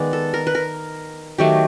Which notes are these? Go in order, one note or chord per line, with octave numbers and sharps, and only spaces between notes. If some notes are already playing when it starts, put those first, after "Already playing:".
Already playing: D#3 G#3 B3 D5
A4
A#4
B4
A#4
D#3 F#3 A3 G4